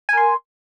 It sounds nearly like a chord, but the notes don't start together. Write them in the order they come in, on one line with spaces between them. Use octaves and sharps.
G#5 A#4 C6